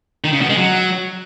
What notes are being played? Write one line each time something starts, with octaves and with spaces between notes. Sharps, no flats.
D#3
C#3
B2
G#3
F#3